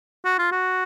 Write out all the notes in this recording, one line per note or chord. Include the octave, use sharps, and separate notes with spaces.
F#4
F4
F#4